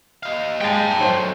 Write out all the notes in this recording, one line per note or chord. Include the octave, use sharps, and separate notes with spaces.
D#4 F5
G#3 G5 A5
F#3 A3 C5